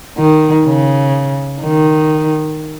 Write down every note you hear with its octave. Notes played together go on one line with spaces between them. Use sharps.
D#3
C#3
D#3